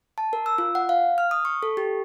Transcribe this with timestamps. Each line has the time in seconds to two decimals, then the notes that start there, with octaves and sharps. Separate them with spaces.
0.18 A5
0.33 A#4
0.46 E6
0.58 F4
0.75 F#5
0.89 F5
1.18 F6
1.31 D#6
1.45 C#6
1.63 A4
1.77 G4